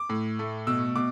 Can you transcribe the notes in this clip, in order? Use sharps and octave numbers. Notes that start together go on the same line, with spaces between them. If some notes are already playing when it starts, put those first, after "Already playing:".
Already playing: D6
A2
A3
B2 E6
B2 D6